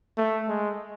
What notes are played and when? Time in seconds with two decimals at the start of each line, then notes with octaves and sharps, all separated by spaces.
0.18 A3
0.48 G#3